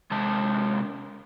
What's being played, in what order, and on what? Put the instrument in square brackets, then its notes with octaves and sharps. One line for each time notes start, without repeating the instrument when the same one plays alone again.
[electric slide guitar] C3 G#3 A5